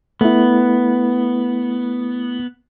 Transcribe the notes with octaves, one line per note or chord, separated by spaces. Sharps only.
A3 B3 E4